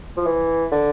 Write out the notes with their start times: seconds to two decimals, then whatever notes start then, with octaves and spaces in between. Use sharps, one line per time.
0.17 F3
0.26 E3
0.72 D3